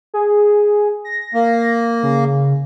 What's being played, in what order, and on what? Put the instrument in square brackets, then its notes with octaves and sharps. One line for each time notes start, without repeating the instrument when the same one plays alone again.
[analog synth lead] G#4
A#6
[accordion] A#3
[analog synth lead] C#3